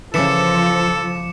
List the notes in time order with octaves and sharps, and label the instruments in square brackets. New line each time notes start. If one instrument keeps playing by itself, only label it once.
[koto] C#3 E3 [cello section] F3 [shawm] A4 [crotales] D6 C#7 E7